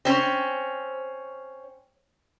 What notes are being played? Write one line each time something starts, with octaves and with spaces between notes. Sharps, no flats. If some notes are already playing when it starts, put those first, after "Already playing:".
C4 C#4